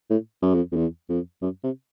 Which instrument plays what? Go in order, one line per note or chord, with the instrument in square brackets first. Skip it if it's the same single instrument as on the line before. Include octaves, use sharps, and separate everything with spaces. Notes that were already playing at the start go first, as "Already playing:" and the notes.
[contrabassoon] A2
F#2
F2
F2
E2
F2
F#2
C3